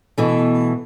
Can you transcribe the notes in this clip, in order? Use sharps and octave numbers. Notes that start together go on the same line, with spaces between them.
B2 E3 A3